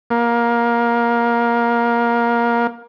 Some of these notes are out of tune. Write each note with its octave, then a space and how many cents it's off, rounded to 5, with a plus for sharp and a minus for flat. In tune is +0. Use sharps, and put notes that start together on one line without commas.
A#3 +20